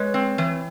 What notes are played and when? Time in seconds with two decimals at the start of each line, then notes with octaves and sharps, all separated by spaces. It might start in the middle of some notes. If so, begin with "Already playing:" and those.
Already playing: G#3 B4 C#5
0.14 C4
0.38 E3